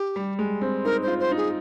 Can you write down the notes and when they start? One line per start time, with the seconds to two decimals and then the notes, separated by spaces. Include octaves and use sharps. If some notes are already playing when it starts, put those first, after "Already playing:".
Already playing: G4
0.16 G3
0.39 G#3
0.61 C4
0.85 D#4 A#4
1.02 F4 C5
1.20 C5
1.31 D#4
1.37 G#4